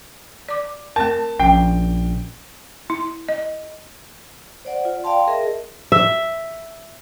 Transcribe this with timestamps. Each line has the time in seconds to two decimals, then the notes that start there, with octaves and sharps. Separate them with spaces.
0.49 D5 D6
0.96 A3 C4 A#4 A5
1.40 A#1 C#4 G5
2.90 E4
3.28 D#5
4.65 C5 D5 F#5
4.85 F4
5.04 D5 F5 G5 A5 C6
5.28 G#4 A#4 D#5 E5
5.92 E5